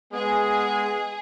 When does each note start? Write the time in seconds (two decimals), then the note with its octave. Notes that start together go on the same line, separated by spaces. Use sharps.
0.13 G#3 B3 G#4